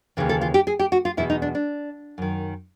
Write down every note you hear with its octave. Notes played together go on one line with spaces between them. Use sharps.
D#2 C#3 E3
A4
F4
G4
G#4
G4
F#4
F4
E2 B2 E4
D#4
D4
D4
F#2 D#3